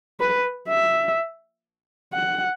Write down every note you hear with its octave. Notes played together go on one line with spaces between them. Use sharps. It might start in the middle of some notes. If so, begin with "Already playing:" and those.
B4
E5
F#5